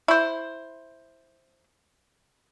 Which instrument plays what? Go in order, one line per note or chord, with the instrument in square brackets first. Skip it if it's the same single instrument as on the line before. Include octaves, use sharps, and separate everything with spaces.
[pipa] E4 C5